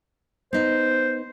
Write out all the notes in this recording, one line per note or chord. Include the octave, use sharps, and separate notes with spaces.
B3 D#4 C5